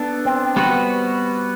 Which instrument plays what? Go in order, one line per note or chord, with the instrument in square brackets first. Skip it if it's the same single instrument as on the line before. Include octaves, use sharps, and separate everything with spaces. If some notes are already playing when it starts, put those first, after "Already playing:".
Already playing: [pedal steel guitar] B3 D4 A4
[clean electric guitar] C4
[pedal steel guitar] G3 B3 F#4 B4